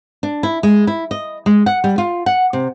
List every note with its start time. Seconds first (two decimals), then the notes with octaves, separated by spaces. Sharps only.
0.23 D4
0.43 E4
0.63 G#3
0.87 E4
1.11 D#5
1.46 G#3
1.66 F#5
1.84 G3
1.98 F4
2.26 F#5
2.53 C3